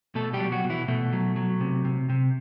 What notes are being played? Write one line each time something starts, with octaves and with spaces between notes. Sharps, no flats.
B2 A3 A4
G3 G4
F#3
F#3 F#4
B2
E3 E4
B2 A3
F#3
F#3
C3
C3
C3